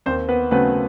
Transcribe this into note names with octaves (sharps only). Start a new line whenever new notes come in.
D#2 C4 C5
B3 B4
C#3 F#3 A3 B3 C4 B4